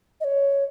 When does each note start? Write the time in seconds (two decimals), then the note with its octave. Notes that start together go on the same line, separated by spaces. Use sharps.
0.21 D#5
0.24 C#5